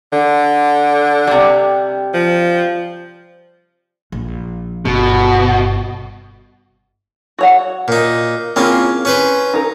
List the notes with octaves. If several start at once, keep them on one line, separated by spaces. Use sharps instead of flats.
D3
C3 G3
F3
A#1
G1 B2
F#4 C#5 F#5
A#2 D#4
A#3 C4 C#4 E4 F4 G#4
C#4 B4 C5
D#4 A#4